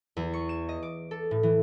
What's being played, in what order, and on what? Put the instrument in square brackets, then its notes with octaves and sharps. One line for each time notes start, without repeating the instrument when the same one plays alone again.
[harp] E2
C#6
E7
D#5
D6
A4
A2
E3